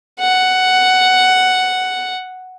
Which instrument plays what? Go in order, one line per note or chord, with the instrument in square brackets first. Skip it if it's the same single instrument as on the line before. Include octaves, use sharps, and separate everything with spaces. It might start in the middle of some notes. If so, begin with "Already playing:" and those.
[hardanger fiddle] F#5